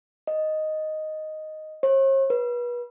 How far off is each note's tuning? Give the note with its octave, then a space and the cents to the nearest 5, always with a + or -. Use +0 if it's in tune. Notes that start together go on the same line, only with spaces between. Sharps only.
D#5 +0
C#5 -45
B4 -35